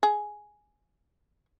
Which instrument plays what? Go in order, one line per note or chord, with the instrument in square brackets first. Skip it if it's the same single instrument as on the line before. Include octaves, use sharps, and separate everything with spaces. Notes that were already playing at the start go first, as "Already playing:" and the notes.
[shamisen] G#4